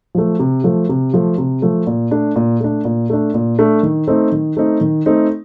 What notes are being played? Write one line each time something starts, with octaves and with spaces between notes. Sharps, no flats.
F3 A3
C3
F3 A3
C3
F3 A3
C3
F3 A3
A#2
A3 D4
A#2
A3 D4
A#2
A3 D4
A#2
A3 D4
D#3
A3 C4 D#4
D#3
A3 C4 D#4
D#3
A3 C4 D#4